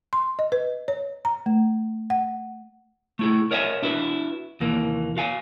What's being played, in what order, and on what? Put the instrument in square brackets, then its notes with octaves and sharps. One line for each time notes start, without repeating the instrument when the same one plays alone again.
[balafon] C6
D#5
B4
C#5
A#5
A3
F#5
[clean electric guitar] A3 E4 G#4
A#4 C#5 D#5 E5 F#5 G#5
D4 E4 F#4 B4
D#2 C3 E3 A#3
F#4 F5 G#5